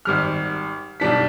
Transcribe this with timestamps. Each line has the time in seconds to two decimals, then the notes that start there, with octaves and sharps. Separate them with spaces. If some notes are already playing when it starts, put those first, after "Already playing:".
0.05 G#1 G3 F6
1.00 B1 G3 D4 B6